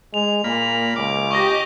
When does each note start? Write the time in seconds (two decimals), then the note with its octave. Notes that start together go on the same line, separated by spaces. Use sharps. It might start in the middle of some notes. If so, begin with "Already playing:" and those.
0.14 G#3 F7
0.44 A#2 A#3 B5
0.96 C#2 D6
1.31 G4 D#5 C#6 A#6